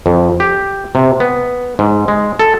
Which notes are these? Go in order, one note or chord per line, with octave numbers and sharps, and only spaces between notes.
F2
G4
C3
B3
G#2
G#3
A4